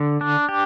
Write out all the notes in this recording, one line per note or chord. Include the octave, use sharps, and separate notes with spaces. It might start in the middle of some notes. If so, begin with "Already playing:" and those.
Already playing: D3
D4
G4